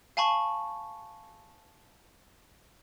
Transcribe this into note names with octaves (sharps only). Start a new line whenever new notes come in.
F5 G#5 A5 B5 C#6